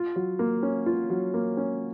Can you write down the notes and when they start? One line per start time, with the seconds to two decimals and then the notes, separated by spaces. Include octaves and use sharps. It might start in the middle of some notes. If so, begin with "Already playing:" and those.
Already playing: F4
0.16 F#3
0.39 A#3
0.63 C#4
0.86 F4
1.10 F#3
1.34 A#3
1.57 C#4